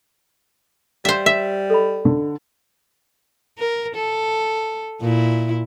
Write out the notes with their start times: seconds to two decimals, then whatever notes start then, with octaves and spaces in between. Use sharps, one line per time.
1.05 G3 C5 E5 F5
1.26 E5
1.70 A4 D#5 B5
2.05 D3
3.59 A#4
3.96 A4
5.01 A#2 E4